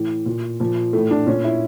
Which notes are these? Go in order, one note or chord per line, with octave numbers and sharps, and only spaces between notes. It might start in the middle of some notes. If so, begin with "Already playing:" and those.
Already playing: A2 E3
A#2
A#2 F3
A2 E3 A3
D4
A#2 C#4
E4